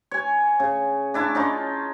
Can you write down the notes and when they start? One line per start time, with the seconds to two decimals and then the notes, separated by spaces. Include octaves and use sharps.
0.11 C#5 G#5
0.60 C#3
1.14 D4 E4 A5 C#6
1.35 C#4 D#4 F4